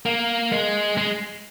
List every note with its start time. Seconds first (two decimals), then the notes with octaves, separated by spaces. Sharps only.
0.06 A#3
0.52 G#3
0.98 G#3